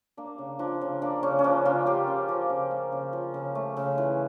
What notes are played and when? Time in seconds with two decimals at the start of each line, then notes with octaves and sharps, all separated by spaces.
0.17 A#3 D4
0.38 C#3
0.59 F3 D4
0.81 C#3
1.02 A#3 D4
1.23 C#3 C#4
1.39 C#4
1.44 F3 D4
1.65 C#3 F4
1.86 A#3 G4
2.08 C#3
2.29 F3
2.50 C#3
2.71 A#3
2.92 C#3
3.13 F3
3.34 C#3
3.55 A3
3.77 C#3
3.98 E3